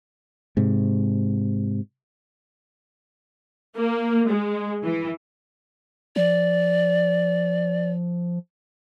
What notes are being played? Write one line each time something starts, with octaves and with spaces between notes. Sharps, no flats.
G#2 C3
A#3
G#3
E3
F3 D5